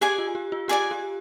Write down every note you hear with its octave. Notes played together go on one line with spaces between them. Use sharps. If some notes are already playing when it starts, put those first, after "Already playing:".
G4 G#4 D5 G#5
F4
G4
F4
G4 G#4 D5 G#5
G4